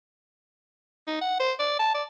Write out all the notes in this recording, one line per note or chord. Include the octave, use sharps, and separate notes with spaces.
D#4
F#5
C5
D5
A5
D5